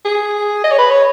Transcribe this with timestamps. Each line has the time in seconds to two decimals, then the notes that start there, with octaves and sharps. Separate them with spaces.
0.05 G#4
0.64 D#5
0.71 C#5
0.78 B4
0.90 C#5